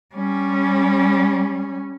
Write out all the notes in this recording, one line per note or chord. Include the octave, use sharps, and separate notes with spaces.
G3 C#4